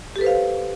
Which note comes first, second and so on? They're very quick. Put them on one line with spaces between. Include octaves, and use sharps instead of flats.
G4 A4 B4 C5 F5